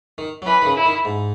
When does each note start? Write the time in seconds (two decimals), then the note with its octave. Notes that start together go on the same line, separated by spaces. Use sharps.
0.18 D#3
0.42 F#3
0.46 E3 B4
0.62 D#3
0.66 C#3
0.76 E4
0.86 D#3
1.05 G#2